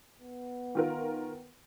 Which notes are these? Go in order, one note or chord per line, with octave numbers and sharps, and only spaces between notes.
B3
D#3 F4 A#4